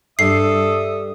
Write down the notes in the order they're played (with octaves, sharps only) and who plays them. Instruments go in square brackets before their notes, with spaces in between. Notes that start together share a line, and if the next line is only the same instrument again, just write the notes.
[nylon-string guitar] G2 G3 [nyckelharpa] A4 [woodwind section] E5 D#6 [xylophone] C7